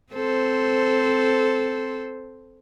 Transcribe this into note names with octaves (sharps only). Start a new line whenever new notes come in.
C4 A4 C5